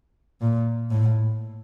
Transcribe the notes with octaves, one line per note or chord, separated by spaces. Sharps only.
A#2
A2